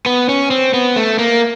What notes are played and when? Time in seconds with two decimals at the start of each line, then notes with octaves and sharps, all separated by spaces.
0.06 B3
0.29 C#4
0.51 C4
0.74 B3
0.96 A3
1.19 A#3